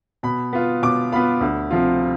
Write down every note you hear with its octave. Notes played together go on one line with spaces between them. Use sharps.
B2 B5
B3 F4
B2 D6
B3 F4 B5
D2
C3 F3 C4 F4